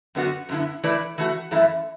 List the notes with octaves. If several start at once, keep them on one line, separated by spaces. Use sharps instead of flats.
F#2 D3 B3 F#4
F#2 D3 B3 E4
E3 A3 E4 B4 D5
E3 A3 F#4
F#2 E3 A3 E4 A4